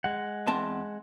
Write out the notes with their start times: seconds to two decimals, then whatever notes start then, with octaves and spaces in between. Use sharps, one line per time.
0.04 G#3 F#5
0.47 E2 C4 A5